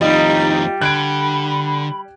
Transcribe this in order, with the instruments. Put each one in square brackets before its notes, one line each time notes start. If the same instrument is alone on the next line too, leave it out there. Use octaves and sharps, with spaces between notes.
[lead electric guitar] F2 D#3 [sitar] G3 [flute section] D#4 [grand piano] F4 D#5
[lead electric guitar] D3 [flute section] B5 [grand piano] F#6 G#6 D7